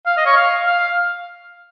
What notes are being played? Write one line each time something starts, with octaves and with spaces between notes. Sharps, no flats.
F5
D#5
C#5
F5
F5